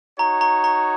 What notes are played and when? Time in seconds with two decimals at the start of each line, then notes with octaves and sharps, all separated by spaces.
0.18 D#4 F#4 C#5 A#5
0.41 A#5
0.64 A#5